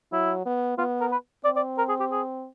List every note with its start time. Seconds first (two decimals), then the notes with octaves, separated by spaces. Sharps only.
0.12 F#3 E4
0.46 B3
0.78 B3 F4
1.01 A#4
1.12 B4
1.44 C4 D5
1.56 D5
1.78 A#4
1.89 G#4
2.00 G4
2.11 G#4